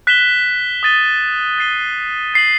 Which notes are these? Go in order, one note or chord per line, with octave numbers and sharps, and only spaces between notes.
F#6 B6 E7 G7
D#6 A6 D#7 G7
A6 C7 D#7 G7
A6 C7 F#7